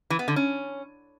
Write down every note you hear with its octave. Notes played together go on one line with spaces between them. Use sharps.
E3
B3
D3
C#4